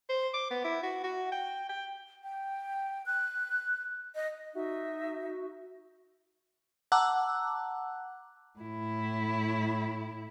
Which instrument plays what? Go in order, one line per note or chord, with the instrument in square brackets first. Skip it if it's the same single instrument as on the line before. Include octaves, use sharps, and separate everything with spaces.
[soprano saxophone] C5
D6
B3
E4
F#4
F#4
G5
G5
[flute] G5
F#6
D#5
[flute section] D#4 E5 [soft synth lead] F#4
[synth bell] F#5 A5 A#5 D6 E6 F#6
[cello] A2 E4